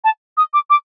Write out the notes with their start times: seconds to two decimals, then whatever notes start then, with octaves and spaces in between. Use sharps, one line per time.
0.04 A5
0.37 D#6
0.54 D6
0.70 D6